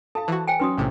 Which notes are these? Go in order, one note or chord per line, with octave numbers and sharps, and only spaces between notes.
A4 F5 A5
E3 F#4 C5 E6
C5 G5 G#5
F#3 C#4 B4 C6 D#6
A#1 A2 C3